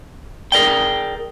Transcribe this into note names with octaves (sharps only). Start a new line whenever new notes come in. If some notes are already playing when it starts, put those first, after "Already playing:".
G#4 A#4 D5 G5